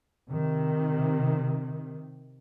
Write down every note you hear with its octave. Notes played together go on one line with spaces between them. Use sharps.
C3 D#3